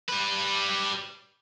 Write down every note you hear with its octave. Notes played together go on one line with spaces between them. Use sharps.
G3 B4